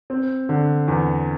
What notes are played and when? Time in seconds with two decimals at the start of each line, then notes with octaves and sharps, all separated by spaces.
0.10 C4
0.49 D3
0.88 E2